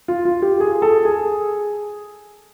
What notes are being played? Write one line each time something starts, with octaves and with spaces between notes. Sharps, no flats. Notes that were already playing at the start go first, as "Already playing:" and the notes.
F4
F4
G4
G#4
A4
G#4